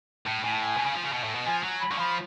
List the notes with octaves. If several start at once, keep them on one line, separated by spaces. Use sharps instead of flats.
A2
A2 G#5
A5
G#5
B2
C#3
F3
C#3
B2
A2
B2
F3 G#5
F#3
B5
D3 C#6
F3 B5